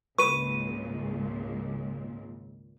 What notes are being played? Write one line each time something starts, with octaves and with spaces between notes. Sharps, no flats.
G#1 C#2 A#2 B4 C#6 D#7